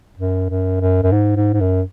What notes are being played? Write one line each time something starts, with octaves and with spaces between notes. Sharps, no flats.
F#2
F#2
F#2
F#2
G#2
G#2
G#2
F#2